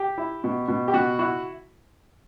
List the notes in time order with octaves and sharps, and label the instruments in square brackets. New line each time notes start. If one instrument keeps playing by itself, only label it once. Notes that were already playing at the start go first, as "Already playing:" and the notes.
Already playing: [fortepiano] G4
E4
B2
B2
G4
B2 F#4
E4 F#4